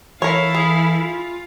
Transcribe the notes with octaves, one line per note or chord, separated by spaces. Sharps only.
E3 E4 A4 A#4 C#5 F5
G#4
F4